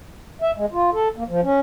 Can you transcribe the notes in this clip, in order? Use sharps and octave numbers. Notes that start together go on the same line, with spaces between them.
E5
G#3
F4
A4
A#3
F3
C#4